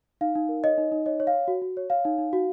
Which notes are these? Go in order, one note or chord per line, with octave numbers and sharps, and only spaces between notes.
D#4 F5
D#4
A#4
C#5 D#5
D#4
D#4
C#5 D#5
C#5
F5
C#5
F#4
F#4
C#5
C#5 F5
D#4
D#4
F#4